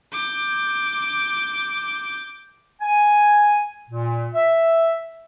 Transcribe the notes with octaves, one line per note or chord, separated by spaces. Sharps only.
D6 G6
G#5
A#2
E5